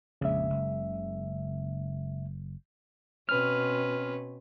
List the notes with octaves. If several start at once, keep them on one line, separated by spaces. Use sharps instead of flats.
A#1 F2 C#3 G#3 E5
F#1
B2 C4 C#4 B4 F6